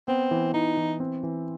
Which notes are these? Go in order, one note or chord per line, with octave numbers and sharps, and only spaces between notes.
B3 C4
E3
E3 D#4
E3
C4
E3